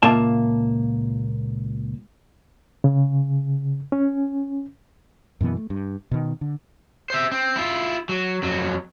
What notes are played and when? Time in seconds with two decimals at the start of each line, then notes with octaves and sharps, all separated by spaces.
0.03 C#2 A#2 A#3 F4 E5 A5
2.84 C#3
3.92 C#4
5.41 F#2 B2 E3 B3
5.57 A3
5.70 G2
6.11 B2 D#3
6.41 D3
7.10 C5 E5
7.32 C4
7.56 E4 F4
8.09 F#3
8.43 F2 F#3